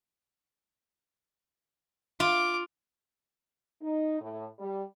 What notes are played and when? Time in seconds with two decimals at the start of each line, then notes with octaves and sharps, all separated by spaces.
2.20 F4 D6
3.82 D#4
4.21 A2
4.59 G3